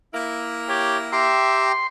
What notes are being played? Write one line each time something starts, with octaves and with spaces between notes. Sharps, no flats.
A#3 E4
G4 C#5
G4 E5 G5 A#5 C6